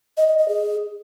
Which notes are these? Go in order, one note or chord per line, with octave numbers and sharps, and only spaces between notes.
D#5
D#5
D#5
G#4